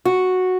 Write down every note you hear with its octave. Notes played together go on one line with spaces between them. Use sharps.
F#4